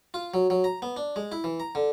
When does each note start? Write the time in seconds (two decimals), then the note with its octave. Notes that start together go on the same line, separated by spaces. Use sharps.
0.14 F4
0.34 F#3
0.50 F#3
0.64 A#5
0.82 B3
0.97 D4
1.16 G#3
1.32 E4
1.44 E3
1.60 A#5
1.75 D3